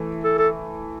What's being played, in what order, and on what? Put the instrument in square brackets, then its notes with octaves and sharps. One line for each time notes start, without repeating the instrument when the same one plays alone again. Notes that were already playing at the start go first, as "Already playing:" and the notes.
Already playing: [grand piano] E3 A3 E4
[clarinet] A4
A4